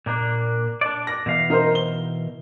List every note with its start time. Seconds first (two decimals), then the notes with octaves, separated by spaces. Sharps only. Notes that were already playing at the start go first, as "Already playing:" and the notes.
0.06 A#2 A#3 D4
0.81 D4 D5
1.07 A#6
1.26 B2 E3 F5
1.50 D#4 A#4 C5
1.75 G7